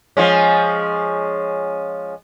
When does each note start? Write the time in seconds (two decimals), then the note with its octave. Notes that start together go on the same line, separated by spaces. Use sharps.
0.17 F3 G#3 C#4